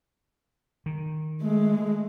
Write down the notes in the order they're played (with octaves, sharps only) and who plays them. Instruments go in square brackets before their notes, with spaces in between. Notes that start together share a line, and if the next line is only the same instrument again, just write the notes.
[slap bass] D#3
[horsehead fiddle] G#3 A3